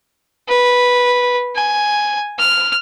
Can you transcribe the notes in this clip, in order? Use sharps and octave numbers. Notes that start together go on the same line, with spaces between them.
B4
G#5
F6